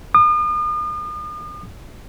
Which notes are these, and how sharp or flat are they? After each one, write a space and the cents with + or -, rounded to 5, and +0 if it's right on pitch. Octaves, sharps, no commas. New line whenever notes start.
D#6 -40